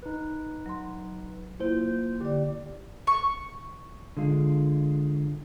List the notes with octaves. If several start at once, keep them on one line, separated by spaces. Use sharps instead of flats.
D#4 B4
F#3 C6
A#3 E4 F4 C5
D3 G4 D5
C#6
D3 G#3 F4